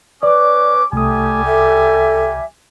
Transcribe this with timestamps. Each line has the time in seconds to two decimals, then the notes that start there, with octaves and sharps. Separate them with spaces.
0.23 C#4 B4 D5 D6
0.93 C2 G3 A3 G4 G#5 D#6
1.46 A4 E5